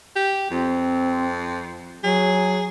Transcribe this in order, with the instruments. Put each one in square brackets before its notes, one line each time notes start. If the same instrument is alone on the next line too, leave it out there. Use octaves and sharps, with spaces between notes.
[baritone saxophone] G4
[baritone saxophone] F2 [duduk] C4
[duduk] F#3 [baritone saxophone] G#4